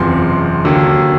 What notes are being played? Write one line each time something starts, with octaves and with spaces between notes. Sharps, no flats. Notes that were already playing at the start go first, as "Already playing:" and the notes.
Already playing: F#1 E2 C3 F3 C6
D#2 D3 F#3 A#3